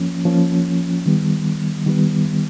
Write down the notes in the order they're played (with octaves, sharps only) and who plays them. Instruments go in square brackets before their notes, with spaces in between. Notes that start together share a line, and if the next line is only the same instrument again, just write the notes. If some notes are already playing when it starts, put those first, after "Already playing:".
Already playing: [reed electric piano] F3 A#3 C#4
F3 A#3 C#4
D#3 G3 B3
D#3 G3 B3